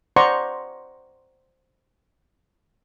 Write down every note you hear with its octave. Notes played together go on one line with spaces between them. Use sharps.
C5 D5 F#5 A#5 C6 C#6